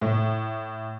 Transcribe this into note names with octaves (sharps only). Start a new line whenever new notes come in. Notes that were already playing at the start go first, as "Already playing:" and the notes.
A2